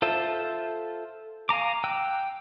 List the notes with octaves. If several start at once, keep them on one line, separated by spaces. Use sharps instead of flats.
F4 A4 C5 E5
F5 G#5 A#5 D6
G5 E6 F#6